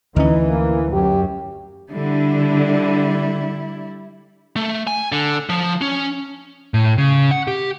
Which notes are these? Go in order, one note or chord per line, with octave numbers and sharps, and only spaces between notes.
D2 E3 C#4 D#4
A#3
F#2 G4
D3 G3 E4
A3
G#5
D3
F3
C#4
A2
C#3
F#5
G4